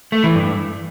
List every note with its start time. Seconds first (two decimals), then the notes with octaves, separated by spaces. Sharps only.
0.12 A3
0.24 E3
0.35 G2